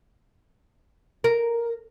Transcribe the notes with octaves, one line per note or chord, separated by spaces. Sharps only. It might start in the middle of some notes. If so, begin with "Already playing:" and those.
A#4